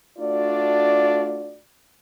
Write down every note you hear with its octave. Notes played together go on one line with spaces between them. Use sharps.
A3 D4 F4 F#4 D5